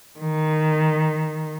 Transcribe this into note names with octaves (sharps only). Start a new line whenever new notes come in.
D#3